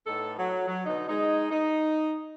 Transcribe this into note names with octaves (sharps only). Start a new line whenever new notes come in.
A2 B3 D#4 A4
F#3
F#3
B2 D3 D#4
G#3 D#4
D#4